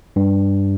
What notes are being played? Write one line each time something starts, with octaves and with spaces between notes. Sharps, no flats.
G2